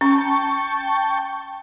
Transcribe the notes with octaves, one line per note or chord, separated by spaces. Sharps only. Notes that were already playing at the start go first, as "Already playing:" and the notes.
C#4 G5 A5 C#6